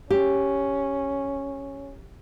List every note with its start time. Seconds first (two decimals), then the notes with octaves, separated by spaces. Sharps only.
0.11 C#4 G4